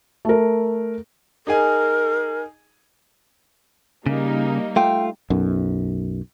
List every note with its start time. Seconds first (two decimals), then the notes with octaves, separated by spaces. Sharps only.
0.25 A3 A#4
1.47 D#4 G#4 A#4 G#5
4.06 C#3 G3 A#3 D#4
4.76 A3 F4 G5
5.30 B1 F#2